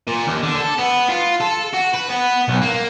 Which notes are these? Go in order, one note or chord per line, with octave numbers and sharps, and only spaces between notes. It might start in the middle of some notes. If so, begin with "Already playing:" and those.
A#2
D#2
D3
A4
B3
F4
A4
F#4
B4
B3
B1
A#3